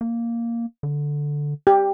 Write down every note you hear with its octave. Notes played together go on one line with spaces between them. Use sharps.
A#3
D3
G4